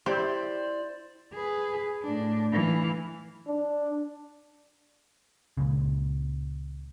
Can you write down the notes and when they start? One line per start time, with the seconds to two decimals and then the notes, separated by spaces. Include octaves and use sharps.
0.06 E4 G4 C5 D5
1.34 G#4 B4
2.03 A2 D4
2.52 E3 F5
3.48 D4
5.57 C#2 A#2 C#3